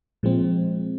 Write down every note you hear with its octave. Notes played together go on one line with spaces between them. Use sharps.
A#2 F3 G#3 C4